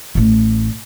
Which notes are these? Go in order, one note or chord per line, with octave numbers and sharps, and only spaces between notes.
A1 A3